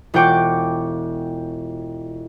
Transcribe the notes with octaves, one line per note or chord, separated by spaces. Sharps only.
E1 F4 F#5 G5 C#6 D6